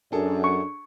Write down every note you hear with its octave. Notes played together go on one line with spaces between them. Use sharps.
F#2 D4 G#4 A4
C#6